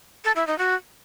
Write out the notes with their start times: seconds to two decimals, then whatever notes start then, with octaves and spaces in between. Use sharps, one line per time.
0.25 A4
0.36 E4
0.47 D#4
0.58 F#4